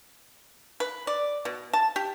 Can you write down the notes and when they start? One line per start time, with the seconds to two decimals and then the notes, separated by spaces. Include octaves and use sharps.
0.80 B4
1.07 D5
1.45 B2
1.73 A5
1.96 G4